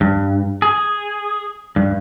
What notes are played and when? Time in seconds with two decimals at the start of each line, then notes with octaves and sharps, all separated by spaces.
0.01 G2
0.62 G#4
1.76 G2